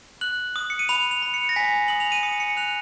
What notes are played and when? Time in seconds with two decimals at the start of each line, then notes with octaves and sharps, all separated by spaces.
0.21 F#6 F#7
0.56 D#6
0.70 C#7
0.79 D#7
0.89 B5 F7
1.11 F7
1.22 B5
1.34 C#7
1.49 A#6
1.56 G#5 B6
1.88 D#6 F#7
2.00 F7
2.12 D#7
2.23 D#6 C#7
2.32 D#7
2.40 C#7
2.57 F#6 F7